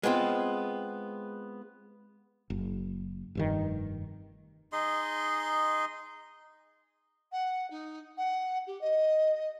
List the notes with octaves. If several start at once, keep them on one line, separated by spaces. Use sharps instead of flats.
G#3 B3 C4 F4
F#1
F1 G2 D#3
D#4 G#4 D#5 C6
F#5
D#4
F#5
G4
D#5